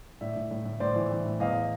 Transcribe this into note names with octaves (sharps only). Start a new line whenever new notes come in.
A2 D5 E5
A2
A2
A2
A2 C5 D5
E3
E3
A2
E2 D#5 F5